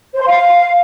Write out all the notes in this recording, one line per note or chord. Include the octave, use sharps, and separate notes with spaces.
C5
C6
F5